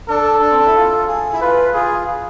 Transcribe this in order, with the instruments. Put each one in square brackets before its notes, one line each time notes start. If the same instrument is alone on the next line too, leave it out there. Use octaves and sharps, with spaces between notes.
[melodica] D4 [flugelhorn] A4
[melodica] D4
C4
D4
E4
F4
G#4
E4
[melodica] F4 [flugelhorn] B4
[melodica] F4 [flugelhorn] G#4